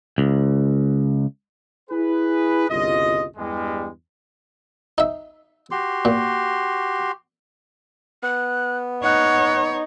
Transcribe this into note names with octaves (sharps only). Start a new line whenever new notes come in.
C#2
E4 G#4 B4
G1 C2 C#3 F4 D#5
E2 G2 G3 G#3
D#4 E5
F#4 G4 C6
A#2
B3 F#6
D#4 C#5 F#5